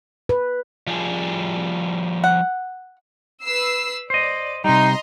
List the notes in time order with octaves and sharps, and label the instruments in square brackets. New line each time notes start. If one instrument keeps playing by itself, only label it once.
[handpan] B4
[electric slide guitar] F3 G3 G#4
[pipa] F#5
[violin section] B4 E6 C7
[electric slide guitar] C5 D#5 [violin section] D5
[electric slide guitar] C3 G3 [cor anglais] D#4 [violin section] D#5 A#5 C6